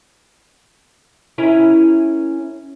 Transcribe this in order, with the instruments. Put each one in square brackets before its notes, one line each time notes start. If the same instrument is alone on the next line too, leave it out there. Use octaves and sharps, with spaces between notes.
[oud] C#4 E4 A#4